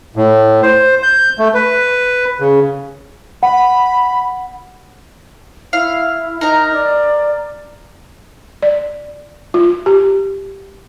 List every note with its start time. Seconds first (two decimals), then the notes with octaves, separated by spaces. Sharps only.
0.16 A2
0.63 C5
1.03 G6
1.39 A3
1.54 B4
2.40 C#3
3.43 F#5 B5
5.73 E4 F5
6.41 D#4 A#4 A#5
6.73 D5
8.62 D5
9.54 F4
9.86 G4